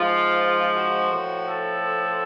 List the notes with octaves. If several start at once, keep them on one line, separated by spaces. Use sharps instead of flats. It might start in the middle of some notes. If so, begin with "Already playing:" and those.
Already playing: G#2 F3 F4
F#4
A2 F3
A4